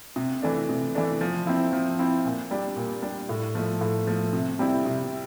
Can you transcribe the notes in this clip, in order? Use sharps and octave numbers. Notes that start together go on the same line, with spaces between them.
C3
E3 A3 D4
C3
E3 A3 D4
F3
C4 E4
F3
C4 E4
A#2
G3 D4
A#2
G3 D4
A2
F3 A3
A2
F3 A3
C3
G3 C4 E4
C3